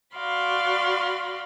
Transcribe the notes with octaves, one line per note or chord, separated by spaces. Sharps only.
F#4 D5 F5 B5 C6